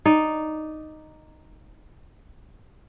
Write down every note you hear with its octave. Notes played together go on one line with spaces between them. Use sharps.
D#4 D5